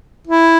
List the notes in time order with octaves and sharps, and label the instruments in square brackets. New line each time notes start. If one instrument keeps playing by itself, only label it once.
[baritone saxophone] E4